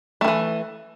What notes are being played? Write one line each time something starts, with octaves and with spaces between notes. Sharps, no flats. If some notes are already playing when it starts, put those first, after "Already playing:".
D#3 E3 A3